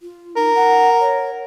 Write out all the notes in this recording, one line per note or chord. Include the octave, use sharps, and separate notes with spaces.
F4
D#4 A#4
F#5
C#5